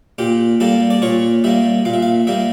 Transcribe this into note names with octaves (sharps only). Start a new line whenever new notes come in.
A#2 G4
G3 A#3 A4
D5
A#2 C#5
G3 A#3 E5
A#2 F5
E5
F5
G3 A#3 E5